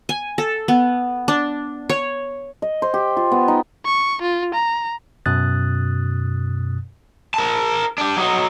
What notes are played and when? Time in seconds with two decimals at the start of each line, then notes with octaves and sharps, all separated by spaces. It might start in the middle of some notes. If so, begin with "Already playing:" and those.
0.09 G#5
0.38 A4
0.68 B3
1.28 D4
1.89 C#5
2.62 D#5
2.82 C5
2.94 G4
3.17 F4
3.32 B3
3.48 D#4
3.86 C#6
4.22 F4
4.54 A#5
5.26 F#2 B2 D#6 F#6 A6
7.34 A#4 A5
7.98 D4 G4
8.17 F#3 D#4